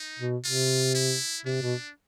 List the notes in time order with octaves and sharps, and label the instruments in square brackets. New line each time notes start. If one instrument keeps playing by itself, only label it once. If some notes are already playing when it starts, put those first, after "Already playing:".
Already playing: [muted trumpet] D#4
[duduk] B2
[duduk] C3 [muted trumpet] F4
[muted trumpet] E4
[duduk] C3 [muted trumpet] D4
[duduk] B2